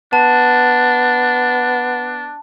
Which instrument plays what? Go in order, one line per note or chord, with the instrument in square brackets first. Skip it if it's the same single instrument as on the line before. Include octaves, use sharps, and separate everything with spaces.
[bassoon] B3 [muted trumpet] D4 [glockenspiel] A5